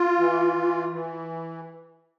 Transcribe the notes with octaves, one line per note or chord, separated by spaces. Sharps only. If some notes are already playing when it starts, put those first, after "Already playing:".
Already playing: F4
E3
E3
E3